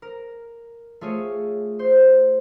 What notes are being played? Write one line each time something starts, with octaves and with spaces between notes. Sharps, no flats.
A#4
A3 F4 G#4 C#5
C5